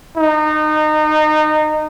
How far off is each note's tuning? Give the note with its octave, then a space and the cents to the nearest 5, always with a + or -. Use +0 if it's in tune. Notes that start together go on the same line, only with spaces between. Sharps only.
D#4 -25